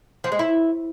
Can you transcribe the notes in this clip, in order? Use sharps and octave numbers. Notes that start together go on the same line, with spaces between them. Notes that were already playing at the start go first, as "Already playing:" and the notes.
F3
G#3
E4